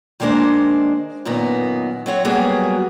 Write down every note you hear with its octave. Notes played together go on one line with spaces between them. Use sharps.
D#3 G3 G#3 A#3 D4 C5
F#2 A#2 D#3 B3
F#3 C4 C#5 F#5
F#3 G3 A#3 B3 F#4 G#4